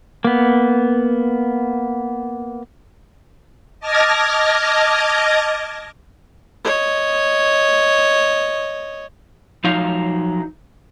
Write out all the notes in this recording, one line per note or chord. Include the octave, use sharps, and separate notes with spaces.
A#3 B3
D#5 A5 D6 F6 G#6 A#6
C#5 D#5
F3 F#3 D#4 F5